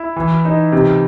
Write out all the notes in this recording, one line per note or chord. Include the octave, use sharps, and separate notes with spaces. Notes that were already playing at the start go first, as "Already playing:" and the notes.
Already playing: E4
E3
D#4
C3